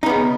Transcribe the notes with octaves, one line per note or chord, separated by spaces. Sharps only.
C#3 B3 D#4